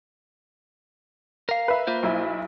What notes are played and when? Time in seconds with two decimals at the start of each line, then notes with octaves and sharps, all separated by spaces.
1.49 A#4 F5
1.68 B4 E5
1.87 A#3 F4 C5
2.03 B1 E4 E5